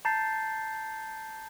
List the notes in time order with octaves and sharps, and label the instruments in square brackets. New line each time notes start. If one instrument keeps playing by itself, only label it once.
[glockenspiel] A5 A#5 G6 A6 C7